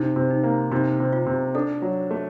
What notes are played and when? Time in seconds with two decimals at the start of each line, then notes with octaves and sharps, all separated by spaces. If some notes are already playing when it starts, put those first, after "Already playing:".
Already playing: C3 D#4
0.16 C3
0.30 D#4
0.43 A#3
0.71 C3 D#4
1.00 C3
1.13 F4
1.26 C3
1.55 D4 A4
1.82 F#3
2.11 A3